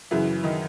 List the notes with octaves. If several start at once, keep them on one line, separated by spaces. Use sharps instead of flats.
F#2 C#3 E3 E4
D#3 D#4